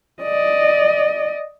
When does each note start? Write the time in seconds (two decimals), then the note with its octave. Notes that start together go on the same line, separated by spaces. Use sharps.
0.22 D5 D#5